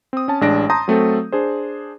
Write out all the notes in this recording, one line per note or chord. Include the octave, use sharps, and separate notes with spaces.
C4 D#6
C#4 A5
A1 G#3 D4 A#6 D7
A5 A#5 C6 D#6 G6 A#6
F#3 A3 C4 A4
D4 G#4 C5